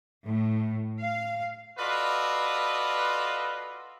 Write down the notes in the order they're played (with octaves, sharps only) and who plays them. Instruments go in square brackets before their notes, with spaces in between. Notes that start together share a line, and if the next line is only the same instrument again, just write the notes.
[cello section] A2
F5
[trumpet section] F4 F#4 A4 B4 D5 D#5